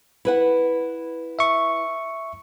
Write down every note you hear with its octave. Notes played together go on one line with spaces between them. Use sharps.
E4 B4 F#5
E5 C#6